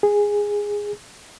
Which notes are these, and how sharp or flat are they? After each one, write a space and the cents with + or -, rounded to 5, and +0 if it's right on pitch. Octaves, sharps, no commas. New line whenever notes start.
G#4 -10